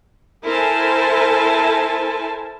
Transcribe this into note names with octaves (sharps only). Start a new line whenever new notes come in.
E4 A4 A#4 C5 G#5 A5